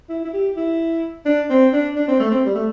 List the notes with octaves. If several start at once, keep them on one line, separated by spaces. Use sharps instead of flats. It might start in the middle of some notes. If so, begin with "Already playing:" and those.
E4
E4
G4
E4
D4
C4
D4
D4
C4
A3
C4
G3
A3